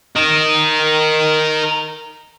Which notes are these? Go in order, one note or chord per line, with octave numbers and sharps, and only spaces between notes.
A#4 D#5